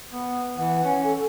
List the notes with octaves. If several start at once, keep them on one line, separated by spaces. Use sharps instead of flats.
B3
E3 F#5
C#4
A4